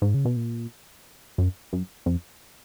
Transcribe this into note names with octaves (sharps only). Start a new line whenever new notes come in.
G#2
C#3
B2
A#2
F#2
F#2
F2